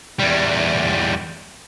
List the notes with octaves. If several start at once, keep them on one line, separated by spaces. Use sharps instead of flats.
E2 G3